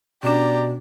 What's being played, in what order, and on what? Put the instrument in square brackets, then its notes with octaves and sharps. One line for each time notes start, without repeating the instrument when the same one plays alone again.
[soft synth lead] B2 [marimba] C#4 D4 [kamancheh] G4 A#5 [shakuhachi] D5